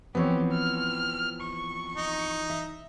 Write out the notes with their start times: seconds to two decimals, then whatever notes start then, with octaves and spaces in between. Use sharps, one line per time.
0.15 E3 F3 B3 C4 G4 C#5
0.51 F6
1.41 C#6
1.95 D#4
2.50 E5